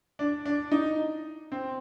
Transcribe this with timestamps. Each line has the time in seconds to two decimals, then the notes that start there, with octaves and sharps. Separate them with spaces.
0.19 D4
0.45 D4
0.72 D#4
1.52 C4